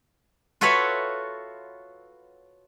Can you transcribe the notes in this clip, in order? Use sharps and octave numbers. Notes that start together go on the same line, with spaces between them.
F4 F#4 A4 B4 C#5 E5